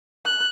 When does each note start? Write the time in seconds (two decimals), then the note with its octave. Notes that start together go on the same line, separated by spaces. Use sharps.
0.25 F#6